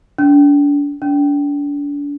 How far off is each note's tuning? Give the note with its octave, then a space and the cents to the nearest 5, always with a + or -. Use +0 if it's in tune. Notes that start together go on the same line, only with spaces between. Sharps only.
D4 -35
D4 -35